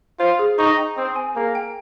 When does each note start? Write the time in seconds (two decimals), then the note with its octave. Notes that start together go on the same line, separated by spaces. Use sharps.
0.20 F4 C5
0.39 G#4
0.59 D#4 C#6
0.77 G5
0.97 C4 D#6
1.16 G#5
1.36 A#3 G#4
1.55 G5